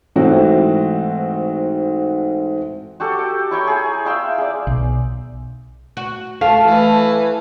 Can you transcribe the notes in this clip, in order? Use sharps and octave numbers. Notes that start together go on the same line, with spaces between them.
G#2 E3 A3 C4 F#4
F#4 G4 A4
G5
E4 C#5 G5 A#5
G#4
E5 F5 G5 C6
G#4 D5
B1
F#4
A3 F5
E3